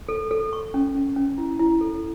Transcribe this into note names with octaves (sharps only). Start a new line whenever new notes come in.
A4
A4
C#6
C#4
C#4
C#4
E4
E4
A4